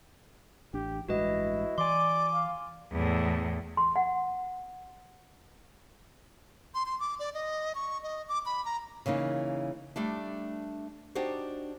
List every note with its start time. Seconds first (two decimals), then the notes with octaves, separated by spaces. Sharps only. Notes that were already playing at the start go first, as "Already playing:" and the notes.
0.74 A1 D4 G4
1.09 A1 G2 G#3 E4 F#4 B4 D#5
1.78 E3 D5 G#5 C6 D6
2.33 F5
2.92 E2 A2
3.77 C6
3.96 F#5
6.75 C6
6.86 C6
7.00 D6
7.19 D5
7.34 D#5
7.75 C#6
8.03 D#5
8.29 D6
8.46 B5
8.65 A#5
9.06 C#3 E3 A#3 D#4
9.96 G3 A3 D4
11.15 D4 D#4 F#4 G4 C5